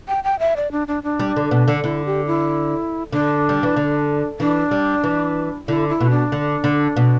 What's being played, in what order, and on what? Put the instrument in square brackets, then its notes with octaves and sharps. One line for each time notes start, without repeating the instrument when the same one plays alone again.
[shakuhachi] G5
G5
E5
D5
D4
D4
D4
[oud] G3
D3
B2
D3
[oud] D3 [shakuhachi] E4
[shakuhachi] G4
E4
[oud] D3 [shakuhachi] D4
[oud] G3
E3
D3
[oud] E3 [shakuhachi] D4
[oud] G3
E3
[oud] D3 [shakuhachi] E4
[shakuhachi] E4
[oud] B2
[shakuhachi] D4
[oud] D3
D3
B2